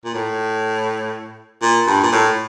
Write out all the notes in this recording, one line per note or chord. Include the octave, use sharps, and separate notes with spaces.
A#2
A2
A#2
G2
A#2
A2